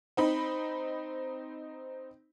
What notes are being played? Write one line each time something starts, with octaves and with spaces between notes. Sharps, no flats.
C4 D#4 B5